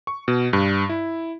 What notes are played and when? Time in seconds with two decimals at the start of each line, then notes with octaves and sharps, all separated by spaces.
0.07 C#6
0.28 B2
0.53 G2
0.89 E4